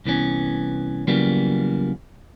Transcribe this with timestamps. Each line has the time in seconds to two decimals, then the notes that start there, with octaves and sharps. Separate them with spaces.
0.05 C2 E3 B3 C#4
1.07 C#3 E3 F#3 G3 A#3 B3